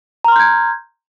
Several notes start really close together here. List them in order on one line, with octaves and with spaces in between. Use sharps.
A#5 F6 C6 G6 G#6